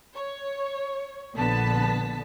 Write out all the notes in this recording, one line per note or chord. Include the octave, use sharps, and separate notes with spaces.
C#5
A#1 D3 B3 A5 B6